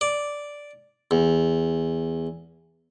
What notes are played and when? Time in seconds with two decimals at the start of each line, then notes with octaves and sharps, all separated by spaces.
0.01 D5
1.11 E2